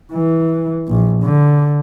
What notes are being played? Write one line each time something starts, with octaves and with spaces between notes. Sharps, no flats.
E3
A#1
D3